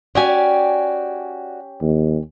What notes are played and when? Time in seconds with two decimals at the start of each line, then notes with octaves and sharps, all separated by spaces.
0.15 C#4 F#4 G4 D5 G#5
1.82 D#2